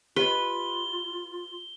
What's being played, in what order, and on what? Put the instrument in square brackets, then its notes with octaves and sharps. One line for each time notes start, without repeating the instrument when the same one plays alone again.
[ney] F4 [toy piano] G4 D#5 [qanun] B4 [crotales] G7